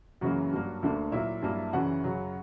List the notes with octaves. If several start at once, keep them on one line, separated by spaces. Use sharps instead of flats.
F#2 C#3 E3 F#3 A#3 F#4
G2 F#3 A#3
D2 D3 A#3
A#2 F#3 A#3 E4 E5
G2 F#3 A#3
F#2 C#3 E3 F#4 F#5
F#2 C#3 F#3